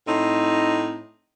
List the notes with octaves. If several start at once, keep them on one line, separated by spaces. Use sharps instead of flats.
A2 C4 D#4